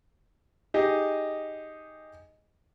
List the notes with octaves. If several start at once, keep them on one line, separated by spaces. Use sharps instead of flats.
D#4 G4 G#4 D#5